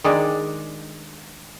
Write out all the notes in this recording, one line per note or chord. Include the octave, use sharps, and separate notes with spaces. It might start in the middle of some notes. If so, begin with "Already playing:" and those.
D#3 G#3 D4